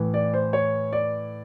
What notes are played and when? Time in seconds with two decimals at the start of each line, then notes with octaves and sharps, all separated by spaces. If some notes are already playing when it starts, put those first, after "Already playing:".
Already playing: A2 E3
0.14 D5
0.34 C5
0.53 C#5
0.93 D5